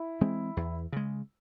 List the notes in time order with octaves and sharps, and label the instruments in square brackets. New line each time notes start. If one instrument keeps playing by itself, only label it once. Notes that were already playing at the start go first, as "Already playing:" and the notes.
Already playing: [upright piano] E4
[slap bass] E3 G#3 C4
E2
C#3 G#3